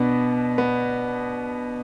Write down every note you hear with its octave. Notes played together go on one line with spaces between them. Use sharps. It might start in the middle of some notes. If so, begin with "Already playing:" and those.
Already playing: B2 B3 D4
B3